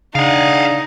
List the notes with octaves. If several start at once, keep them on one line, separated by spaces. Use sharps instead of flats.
C#3 D4 D#4 F5 F#5